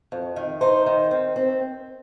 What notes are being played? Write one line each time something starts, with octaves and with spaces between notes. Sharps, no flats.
F2
D#3
D#4 C5
D#3
C4
C4